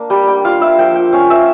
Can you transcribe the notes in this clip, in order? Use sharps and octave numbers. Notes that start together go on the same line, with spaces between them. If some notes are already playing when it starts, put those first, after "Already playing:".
Already playing: A#3 D4
G3 G5
G5
F4 F5
E5
F3 G5
G5
C#4 F5
E5